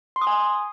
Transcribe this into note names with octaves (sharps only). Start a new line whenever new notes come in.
C6
D#6
G#5